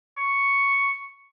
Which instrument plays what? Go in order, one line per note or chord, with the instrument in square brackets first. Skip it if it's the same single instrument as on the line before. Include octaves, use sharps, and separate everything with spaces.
[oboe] C#6